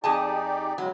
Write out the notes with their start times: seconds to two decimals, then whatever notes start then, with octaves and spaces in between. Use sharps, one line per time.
0.04 F2 D#4 G4 G#4 D5 A5
0.78 E2 C#3 F#3 G#3